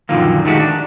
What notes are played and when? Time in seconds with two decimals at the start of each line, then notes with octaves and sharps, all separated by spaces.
0.09 F#2 A#2 D3 D#3 F3 A#3
0.45 D#3 G#3 A3 F#4 G4
0.60 D4